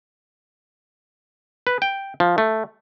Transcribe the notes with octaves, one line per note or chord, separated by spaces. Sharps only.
B4
G5
F3
A3